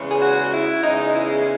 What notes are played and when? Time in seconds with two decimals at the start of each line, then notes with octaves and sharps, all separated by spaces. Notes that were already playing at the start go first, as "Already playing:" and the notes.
Already playing: E2 C#3 G#3
0.09 G#4
0.21 F#4
0.51 E4
0.82 E2 C#3 G#3 D#4
1.13 E4